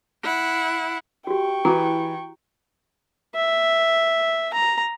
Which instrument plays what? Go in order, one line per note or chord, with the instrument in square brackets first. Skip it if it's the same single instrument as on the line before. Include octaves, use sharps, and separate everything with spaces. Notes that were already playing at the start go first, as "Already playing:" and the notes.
[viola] E4 F#5
[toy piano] F#4 G4 [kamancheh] G5 C#6
[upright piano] E3 G4 B4 [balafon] E4 F#4 [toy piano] A#5
[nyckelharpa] E5
A#5